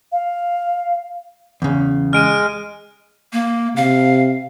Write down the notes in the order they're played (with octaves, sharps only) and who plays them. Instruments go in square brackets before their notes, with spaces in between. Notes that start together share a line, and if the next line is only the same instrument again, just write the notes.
[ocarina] F5
[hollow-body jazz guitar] E2 C#3
[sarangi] G#3 [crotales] F6 D7 D#7
[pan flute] A#3
[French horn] C3 [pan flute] F5